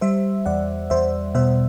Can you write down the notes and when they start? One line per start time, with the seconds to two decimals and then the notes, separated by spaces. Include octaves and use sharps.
0.01 G3 C5 E5
0.46 E2 D5 F#5
0.90 E2 C5 E5
1.35 B2 C5 E5